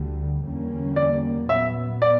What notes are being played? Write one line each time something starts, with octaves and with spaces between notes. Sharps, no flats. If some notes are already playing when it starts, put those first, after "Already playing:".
Already playing: D2 D3 G3
E2 D3 G3 A#3 C#4
D5
A#2 F#3 B3 E5
D5